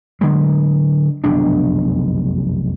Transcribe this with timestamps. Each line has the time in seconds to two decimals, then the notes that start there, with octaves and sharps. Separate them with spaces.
0.21 D3 F#3 G#3
1.24 F1 B1 F#2 D4